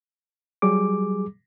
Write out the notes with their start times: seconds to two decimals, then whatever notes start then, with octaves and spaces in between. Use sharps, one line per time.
0.62 F#3 G3 G#4 D6